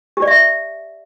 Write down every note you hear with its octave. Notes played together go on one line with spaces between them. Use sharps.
G4
D5
E5